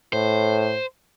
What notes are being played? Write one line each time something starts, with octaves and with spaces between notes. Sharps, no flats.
A2 C5